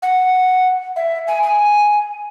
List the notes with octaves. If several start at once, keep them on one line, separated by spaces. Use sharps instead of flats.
F#5
E5
G#5
G#5